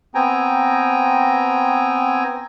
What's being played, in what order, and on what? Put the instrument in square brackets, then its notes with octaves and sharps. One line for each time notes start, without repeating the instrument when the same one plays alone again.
[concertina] B3 C4 G5 G#5 A#5